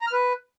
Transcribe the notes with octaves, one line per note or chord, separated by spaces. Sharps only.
A#5
F6
B4